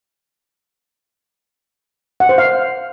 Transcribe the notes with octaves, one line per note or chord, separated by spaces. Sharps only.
F#5
C5
F5